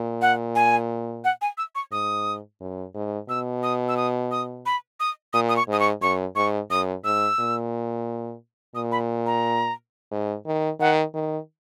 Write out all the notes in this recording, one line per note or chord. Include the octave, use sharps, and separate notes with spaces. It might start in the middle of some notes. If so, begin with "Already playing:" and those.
Already playing: A#2
F#5
G#5
F#5
G#5
E6
C#6
G#2 D#6
F#2
G#2
B2 E6
D#6
E6
D#6
D#6
B5
D#6
A#2 D#6
D#6
C#6
G#2 D#6
C#6
F#2 C#6
G#2 C#6
F#2 D#6
G#2 E6
A#2
A#2 D#6
B5
A#5
G#2
D#3
D#3 F#5
D#3